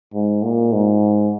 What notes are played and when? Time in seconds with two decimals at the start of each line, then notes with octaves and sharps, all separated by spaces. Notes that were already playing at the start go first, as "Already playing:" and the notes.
0.14 G#2
0.43 A#2
0.72 G#2